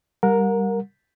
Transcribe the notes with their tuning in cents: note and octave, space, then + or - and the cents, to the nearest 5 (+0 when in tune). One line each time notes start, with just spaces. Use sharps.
G3 +0 A#4 +0 F#5 -35